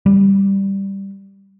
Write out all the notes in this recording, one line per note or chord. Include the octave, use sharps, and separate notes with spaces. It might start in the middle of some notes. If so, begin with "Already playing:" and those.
G3